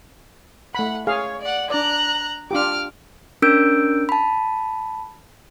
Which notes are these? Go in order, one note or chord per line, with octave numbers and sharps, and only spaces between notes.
A3 F#5 B5
G#4 C#5 F5
D5 F#5
D4 D5 A#5 F#6
D4 F4 G4 D6 F6
C#4 D4 A#4 E6 G6 D7
A5 B5